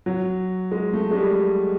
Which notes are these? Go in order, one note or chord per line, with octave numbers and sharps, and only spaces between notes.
F#3
G#3
A3
G#3
G3